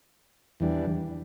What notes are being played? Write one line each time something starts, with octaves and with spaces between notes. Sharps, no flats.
E2 E3 G3 D4